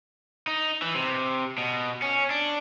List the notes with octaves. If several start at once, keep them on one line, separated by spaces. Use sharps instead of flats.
D#4
E3
C3
B2
C#4
D4